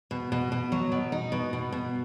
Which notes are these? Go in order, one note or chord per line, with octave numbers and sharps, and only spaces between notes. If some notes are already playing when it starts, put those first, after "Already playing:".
B2
B2
B2
F#3
B2
D#4
B2
B2
B2